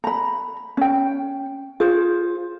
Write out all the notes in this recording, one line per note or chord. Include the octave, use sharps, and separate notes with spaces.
A#5 B5
C#4 G5
F4 G#4 C5